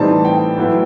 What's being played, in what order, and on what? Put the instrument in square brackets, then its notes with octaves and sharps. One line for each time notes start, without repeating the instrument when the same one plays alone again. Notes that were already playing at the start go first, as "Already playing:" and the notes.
Already playing: [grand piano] A2 E3 G3 C4 D#4 A5
G5
A2 F#3 B3 E4